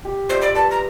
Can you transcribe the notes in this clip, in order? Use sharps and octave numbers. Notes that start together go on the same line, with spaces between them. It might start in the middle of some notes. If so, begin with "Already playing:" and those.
G4
F4 C5 D5 E5
D5 B5
B4 A5
A#5